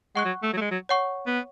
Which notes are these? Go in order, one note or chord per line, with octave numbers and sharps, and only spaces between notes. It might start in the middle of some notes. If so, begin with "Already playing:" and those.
G#3 F#5 C#6 F#6
F#3
A3
F#3
A3
G#3
F#3
C#5 F#5 C#6
B3